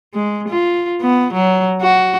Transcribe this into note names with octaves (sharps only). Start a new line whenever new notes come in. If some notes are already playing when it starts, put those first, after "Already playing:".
G#3
F4
B3
F#3
F#4